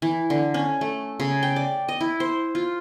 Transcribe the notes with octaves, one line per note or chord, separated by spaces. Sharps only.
E3
D3
C#4
A3
C#3
G5
D5
D#5
E4
C5
F4